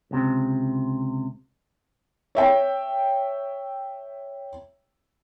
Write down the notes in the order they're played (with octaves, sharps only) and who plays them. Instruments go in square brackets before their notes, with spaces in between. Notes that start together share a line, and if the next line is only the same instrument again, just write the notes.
[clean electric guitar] C#2 C3
[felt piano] C#5 E5 G5